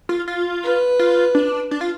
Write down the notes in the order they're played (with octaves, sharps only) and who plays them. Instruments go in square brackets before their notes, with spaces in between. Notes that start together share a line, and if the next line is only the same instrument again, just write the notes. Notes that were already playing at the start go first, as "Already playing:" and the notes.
[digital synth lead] F4
F4
[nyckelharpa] B4
[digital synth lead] F4
D4
D4
F4